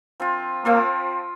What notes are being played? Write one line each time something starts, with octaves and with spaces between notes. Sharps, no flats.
F3 C4 F4
F3 A#3 C4 F4